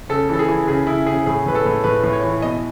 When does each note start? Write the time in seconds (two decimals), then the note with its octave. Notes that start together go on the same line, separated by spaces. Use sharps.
0.09 C#3 A4
0.29 E3 A4
0.39 G#4
0.48 E3
0.67 C#3 G#4
0.87 C#3 E4
1.06 C#3 G#4
1.26 A2 G#4
1.46 A2 B4
1.55 A4
1.65 A2
1.84 A2 B4
2.03 A2
2.13 C#5
2.23 E3
2.42 B2 D#5